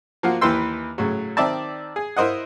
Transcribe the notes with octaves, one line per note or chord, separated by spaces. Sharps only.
F3 A#3 F4 F#4
D#2 E3 B4 G5 C6 E6
A2 C#3 F#3
D#3 C4 D5 E5 A5
G#4
E4 A#4 C5 D#5 F#5